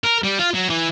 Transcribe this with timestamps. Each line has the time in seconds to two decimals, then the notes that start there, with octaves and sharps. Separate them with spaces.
0.04 A#4
0.23 G3
0.39 F4
0.54 F#3
0.69 E3